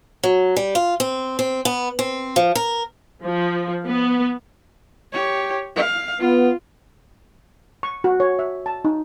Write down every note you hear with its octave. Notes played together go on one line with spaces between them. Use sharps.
F#3
G3
F4
C4
C4
B3
C4
F3
A#4
F3
B3
G4 C#5
F5
B3 F4
C#6
F#4
C#5
E5
A5
D#4